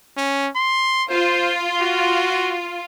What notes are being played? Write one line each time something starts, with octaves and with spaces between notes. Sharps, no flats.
C#4
C6
F4 C5
F#4